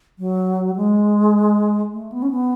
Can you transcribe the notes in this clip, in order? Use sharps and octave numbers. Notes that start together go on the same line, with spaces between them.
F#3
G#3
A3
B3
C#4
B3